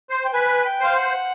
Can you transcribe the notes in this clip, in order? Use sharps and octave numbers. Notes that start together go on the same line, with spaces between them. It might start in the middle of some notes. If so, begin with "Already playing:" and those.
C5
G5
B4 G#5
G5
C5 F5
F#5